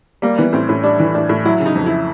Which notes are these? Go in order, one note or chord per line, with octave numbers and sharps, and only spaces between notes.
G3 A#3
E3 B3
A2 C4
A2 C#4
G3 D4
E3
A2 D4
A2
F#3 E4
C#3
D#4
F2
E4